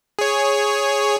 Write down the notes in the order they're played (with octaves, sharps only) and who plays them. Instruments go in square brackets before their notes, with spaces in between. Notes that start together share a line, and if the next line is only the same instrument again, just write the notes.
[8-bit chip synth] G#4 C#5